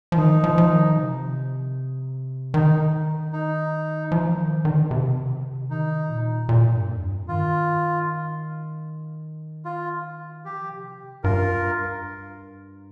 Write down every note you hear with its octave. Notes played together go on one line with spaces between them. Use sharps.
F3
D#3 D#4
F3
F3
D#3
C3
D#3 D#4
D#4
F3
D#3
D#3
C3
D#3 D#4
A#2
A#2
G2
F2
G2
D#3 F4
F4
F3 G4
C3
G2 F4 A#4